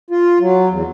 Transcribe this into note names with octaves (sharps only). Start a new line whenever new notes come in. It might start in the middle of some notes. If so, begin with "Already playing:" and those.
F4
F#3
E2